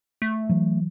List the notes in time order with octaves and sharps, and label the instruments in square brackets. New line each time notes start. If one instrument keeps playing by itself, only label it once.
[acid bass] A3
[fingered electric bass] E3 F#3